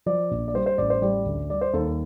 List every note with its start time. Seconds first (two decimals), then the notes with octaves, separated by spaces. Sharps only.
0.06 F3 D5
0.31 A#1
0.48 D5
0.54 G3 C5
0.66 C5
0.78 A1 D5
0.90 C5
1.02 G3 D5
1.26 D2
1.50 G3 D5
1.61 C5
1.73 D#2 A4